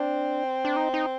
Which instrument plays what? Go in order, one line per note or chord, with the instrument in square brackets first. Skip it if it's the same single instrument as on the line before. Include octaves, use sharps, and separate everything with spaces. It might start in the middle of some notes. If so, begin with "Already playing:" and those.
Already playing: [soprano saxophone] C4 [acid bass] D4
[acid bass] D4
D#4
D#4